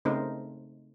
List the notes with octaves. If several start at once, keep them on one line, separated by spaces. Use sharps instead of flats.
C#3 A3 C4 D#4 A#4 C5